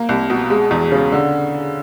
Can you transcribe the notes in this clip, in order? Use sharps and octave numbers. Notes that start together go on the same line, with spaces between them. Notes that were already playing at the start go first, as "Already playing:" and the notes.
Already playing: A#3
C2
B2
G#3
E2
C#3
D3